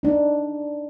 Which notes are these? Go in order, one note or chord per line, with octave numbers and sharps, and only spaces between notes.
D4 D#4